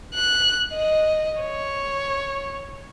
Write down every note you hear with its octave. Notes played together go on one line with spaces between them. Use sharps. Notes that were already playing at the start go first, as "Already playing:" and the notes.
F#6
D#5
C#5